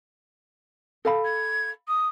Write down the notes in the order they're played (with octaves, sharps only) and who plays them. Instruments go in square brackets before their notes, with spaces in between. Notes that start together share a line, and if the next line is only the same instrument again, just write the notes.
[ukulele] A4 F5 B5
[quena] G#6
D#6